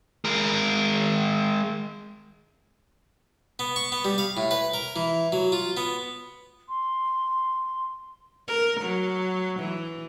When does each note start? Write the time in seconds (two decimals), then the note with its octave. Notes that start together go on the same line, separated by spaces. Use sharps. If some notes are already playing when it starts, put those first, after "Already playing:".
0.25 G#3 A#4
3.59 B3
3.76 C#6
3.92 B3
4.05 G3
4.18 F5
4.37 A2
4.51 B4
4.74 A#4
4.96 E3
5.32 F#3
5.52 F4
5.77 B3
6.69 C6
8.48 A#4
8.80 F#3
9.60 E3